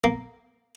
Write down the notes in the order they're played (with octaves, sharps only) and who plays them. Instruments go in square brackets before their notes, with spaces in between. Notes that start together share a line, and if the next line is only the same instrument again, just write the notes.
[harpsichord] A#3